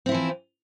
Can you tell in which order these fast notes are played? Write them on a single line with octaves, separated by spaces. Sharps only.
C4 E4 F3 E3